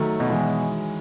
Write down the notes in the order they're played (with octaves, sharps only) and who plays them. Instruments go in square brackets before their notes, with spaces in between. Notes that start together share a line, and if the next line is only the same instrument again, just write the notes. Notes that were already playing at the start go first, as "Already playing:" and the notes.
Already playing: [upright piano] D#3 F#3 [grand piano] A3
[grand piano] B2
[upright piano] E3 G#3